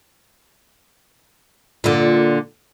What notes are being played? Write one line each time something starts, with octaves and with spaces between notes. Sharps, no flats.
A#2 D3